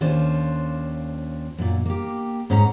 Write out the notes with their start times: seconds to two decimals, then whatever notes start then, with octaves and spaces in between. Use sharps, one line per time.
0.01 D#2 C#4 D4 F4 C5
1.58 F#2 A#2
1.85 A#3 G4
2.50 G#2 C#4 F#5 A#5